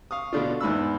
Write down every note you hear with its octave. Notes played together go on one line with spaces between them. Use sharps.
F5 C#6 D#6
B2 D3 D4 F4
E2 G#2 B5 E6